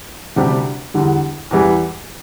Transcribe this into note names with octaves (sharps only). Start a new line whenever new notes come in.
D2 C3 G3 D4 G4
E2 D3 G3
E2 E3 G3